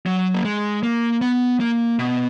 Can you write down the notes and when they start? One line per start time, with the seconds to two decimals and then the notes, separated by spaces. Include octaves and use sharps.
0.06 F#3
0.34 A#3
0.45 G#3
0.83 A#3
1.21 B3
1.60 A#3
1.99 B2